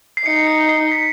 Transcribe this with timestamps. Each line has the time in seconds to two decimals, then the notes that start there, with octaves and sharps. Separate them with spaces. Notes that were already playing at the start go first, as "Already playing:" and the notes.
0.17 C7
0.26 D#4 C#7
0.47 C#7
0.69 C7
0.92 B6